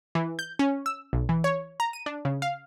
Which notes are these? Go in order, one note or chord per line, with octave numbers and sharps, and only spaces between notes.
E3
G6
C#4
E6
B1
E3
C#5
A#5
D#7
D4
C#3
F5